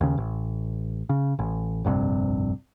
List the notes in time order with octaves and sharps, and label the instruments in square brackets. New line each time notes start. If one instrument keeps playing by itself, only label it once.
[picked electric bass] D#2 C#3
A1
C#3
A1
F1 A#1 G2 C3